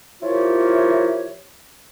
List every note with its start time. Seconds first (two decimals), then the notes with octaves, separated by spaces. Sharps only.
0.22 F3 E4 F4 G4 A#4 C#5